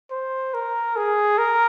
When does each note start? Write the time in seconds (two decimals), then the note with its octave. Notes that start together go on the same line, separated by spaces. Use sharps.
0.11 C5
0.54 A#4
0.96 G#4
1.38 A#4